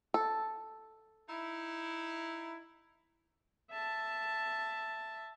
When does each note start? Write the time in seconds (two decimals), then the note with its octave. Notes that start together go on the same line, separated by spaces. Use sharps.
0.14 A4
1.29 D#4 E4
3.71 E5 A5